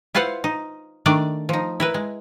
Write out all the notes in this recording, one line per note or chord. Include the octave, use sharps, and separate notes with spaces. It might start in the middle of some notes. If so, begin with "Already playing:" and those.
E4 F4 B4 C5 F5 F#5
D#4
D#3 A3 D4 D5
F3 D#4
E4 A#4 B4
G#3